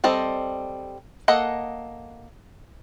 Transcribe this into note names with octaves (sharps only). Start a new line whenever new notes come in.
G3 C4 A4 D#5
A#3 A4 D#5 F#5